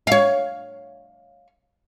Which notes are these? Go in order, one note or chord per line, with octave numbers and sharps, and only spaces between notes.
C#5 F5